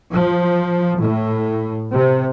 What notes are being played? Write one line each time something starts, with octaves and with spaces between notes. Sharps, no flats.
F3
A2
C3